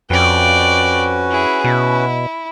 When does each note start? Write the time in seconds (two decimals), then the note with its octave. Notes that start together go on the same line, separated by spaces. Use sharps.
0.10 F2 C#4 F#4 B4 D5 G5
1.31 E4 G#4
1.64 B2 E4